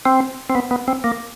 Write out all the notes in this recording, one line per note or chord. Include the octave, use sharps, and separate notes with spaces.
C4
C4
B3
B3
C4
A#3